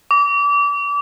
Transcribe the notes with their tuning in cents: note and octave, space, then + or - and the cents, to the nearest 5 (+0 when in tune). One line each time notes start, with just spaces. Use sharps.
D6 -30